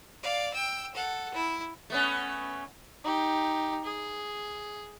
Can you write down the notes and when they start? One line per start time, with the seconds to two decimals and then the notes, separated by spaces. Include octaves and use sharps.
0.23 D5 F5
0.54 G5 E6
0.95 A4 F#5
1.34 E4
1.90 A3 B3 C#4
3.04 D#4 G4
3.84 G#4